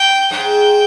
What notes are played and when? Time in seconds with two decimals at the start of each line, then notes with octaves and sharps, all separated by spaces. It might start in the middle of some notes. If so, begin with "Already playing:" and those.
Already playing: G5
0.31 G#2 G5